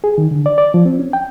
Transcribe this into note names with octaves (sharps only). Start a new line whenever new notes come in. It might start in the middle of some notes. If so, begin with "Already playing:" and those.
G#4
D#3
D3
D5
D5
F3
C4
C#4
G5